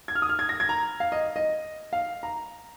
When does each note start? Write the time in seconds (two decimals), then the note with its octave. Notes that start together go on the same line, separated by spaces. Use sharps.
0.08 G#6
0.15 F6
0.22 D#6
0.29 F6
0.39 G#6
0.49 A#6
0.60 G#6
0.69 A#5
1.00 F5
1.12 D#5
1.36 D#5
1.93 F5
2.23 A#5